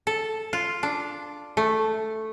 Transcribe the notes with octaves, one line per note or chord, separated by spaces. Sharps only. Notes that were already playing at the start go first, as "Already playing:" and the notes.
A4
F4
D4
A3